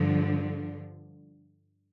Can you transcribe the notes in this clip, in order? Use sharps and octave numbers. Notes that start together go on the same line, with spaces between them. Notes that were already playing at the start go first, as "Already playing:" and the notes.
Already playing: G2 D3 F3